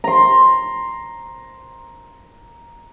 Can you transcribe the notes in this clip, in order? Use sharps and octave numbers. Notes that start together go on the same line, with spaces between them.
A#5 C6